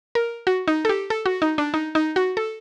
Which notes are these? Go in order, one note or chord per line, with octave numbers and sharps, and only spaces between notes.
A#4
F#4
D#4
A4
G4
A4
F#4
D#4
D4
D#4
D#4
F#4
A4